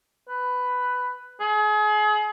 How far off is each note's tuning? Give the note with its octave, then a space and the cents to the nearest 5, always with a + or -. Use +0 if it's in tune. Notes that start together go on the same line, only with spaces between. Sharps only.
B4 +10
G#4 +35